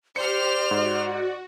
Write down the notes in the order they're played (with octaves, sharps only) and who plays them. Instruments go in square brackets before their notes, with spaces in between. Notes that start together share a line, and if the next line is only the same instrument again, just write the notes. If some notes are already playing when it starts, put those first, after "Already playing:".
[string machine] G4 [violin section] C5 F6 [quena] D5 [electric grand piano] C#7
[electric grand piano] G#2 [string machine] F#4